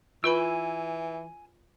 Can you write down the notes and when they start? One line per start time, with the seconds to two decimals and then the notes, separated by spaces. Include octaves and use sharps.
0.24 E3 F4 B4 G#5 B5 E6